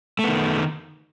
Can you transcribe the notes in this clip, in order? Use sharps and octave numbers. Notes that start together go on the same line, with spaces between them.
D#3 A3 B3